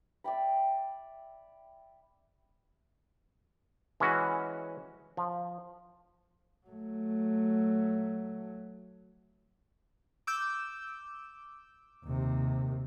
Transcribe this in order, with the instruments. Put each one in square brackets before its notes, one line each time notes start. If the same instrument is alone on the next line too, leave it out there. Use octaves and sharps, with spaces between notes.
[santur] D5 E5 G5 B5
[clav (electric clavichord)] E3 G#3 C#4 F#4
F3
[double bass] F#3 A3
[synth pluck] D6 E6 G6
[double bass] D#2 C3